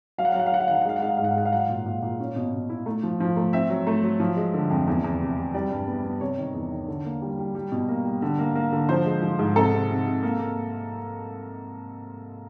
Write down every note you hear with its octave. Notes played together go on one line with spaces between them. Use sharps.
F#3 F5
F#5
F5
F#3 F#5
F5
F#3 F#5
F5
D#3 F#5
F5
F#5
G#3 F5
F#5
G#3 F5
F#5
G#2 F5
F#5
F5
G#3 F#5
F5
F#3 F#5
F5
A#2
A#2
A#2
C#4
B2
B2
E4
A3
F3
F3
A3
C4 E5
F#3
A3
F#3
F3
G#3
D3
F2
E2
E2
C3
C3
G3 D5
G2
B3
B3
C3 C#5
D#3
E2
D#3
D3
A#3
G3
G3
G3
B2
A#3
G3
D3
A#3
A#3
D3
F3 C5
G#3
F3
G#2
C3 A4
C3
C3
C3
A#3
A#3